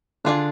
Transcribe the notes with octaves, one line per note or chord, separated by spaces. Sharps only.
D3 D4 F4 G#4 D5